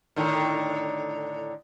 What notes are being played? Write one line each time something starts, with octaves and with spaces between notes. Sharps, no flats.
A2 D3 D#3